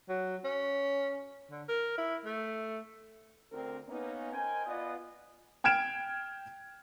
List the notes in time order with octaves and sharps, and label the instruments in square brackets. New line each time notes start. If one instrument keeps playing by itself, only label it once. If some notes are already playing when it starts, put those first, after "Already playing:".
[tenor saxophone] F#3
C#4
D3
A#4
E4
A3
[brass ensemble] D2 D3 C4 A#4
A#3 B3 C#4 D#4
A#4 C5 D#5 G5 G#5
B3 F4 D5 D#5
[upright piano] G5 F6 G#6 D7 E7